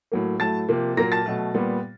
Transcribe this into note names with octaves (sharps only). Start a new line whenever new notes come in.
A2 F#3 A#3
A2 F#3 A3 A5 A6
C3 F3 A#3
A#2 F#3 A#3 A#5 A#6
A5 A6
B2 F#3 A3
A#2 G3 B3